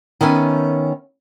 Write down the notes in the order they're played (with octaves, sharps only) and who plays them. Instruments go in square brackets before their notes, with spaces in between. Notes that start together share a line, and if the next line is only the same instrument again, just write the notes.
[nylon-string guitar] D#3 B3 C#4 E5 G#5